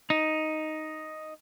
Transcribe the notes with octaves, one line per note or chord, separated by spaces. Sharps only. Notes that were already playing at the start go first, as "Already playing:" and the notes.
D#4